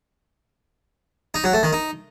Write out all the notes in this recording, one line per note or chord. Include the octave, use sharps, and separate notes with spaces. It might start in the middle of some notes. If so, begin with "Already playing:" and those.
D#4
F#3
A3
D#3
D#4